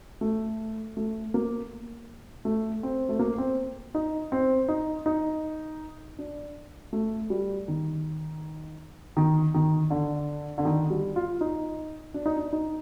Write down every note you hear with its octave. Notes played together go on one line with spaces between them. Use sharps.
A3
A3
A#3
A3
C4
A3
A#3
C4
D#4
C4
D#4
D#4
D4
A3
G3
D#3
D#3
D#3
D3
D3
D#3
G3
F4
D#4
D4
D#4
D4
D#4